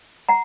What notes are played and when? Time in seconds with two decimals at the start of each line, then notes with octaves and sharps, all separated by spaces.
0.29 F#5 A#5